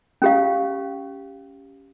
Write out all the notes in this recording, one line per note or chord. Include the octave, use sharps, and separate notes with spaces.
C#4 G4 F5